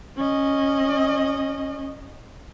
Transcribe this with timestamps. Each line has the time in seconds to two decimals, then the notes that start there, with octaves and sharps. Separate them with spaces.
0.17 C#4 D#5